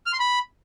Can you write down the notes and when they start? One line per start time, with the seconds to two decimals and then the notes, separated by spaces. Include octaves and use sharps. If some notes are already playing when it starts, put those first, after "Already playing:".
0.06 F6
0.13 C6
0.20 B5